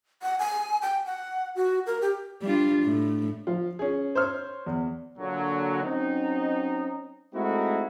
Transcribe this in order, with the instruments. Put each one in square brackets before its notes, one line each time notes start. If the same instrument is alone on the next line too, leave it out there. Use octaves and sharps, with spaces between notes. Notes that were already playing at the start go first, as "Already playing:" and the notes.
[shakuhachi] F#5
G#5
G5
F#5
F#4
A#4
G4
[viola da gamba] G3 D4 F4
A2
[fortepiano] F3 F4
C#4 G#4
C5 C#5 F6
E2
[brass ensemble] A#2 D3 F#3
F#3 C4 C#4 D#4
G#3 A3 C4 D#4 E4 F#4